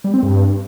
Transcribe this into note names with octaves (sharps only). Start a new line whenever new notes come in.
G3
C4
G2